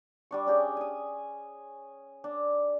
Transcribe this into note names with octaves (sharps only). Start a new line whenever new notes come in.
G3 D4 C#6
C#4 D4 G4 G#4
G#5 D#6
D4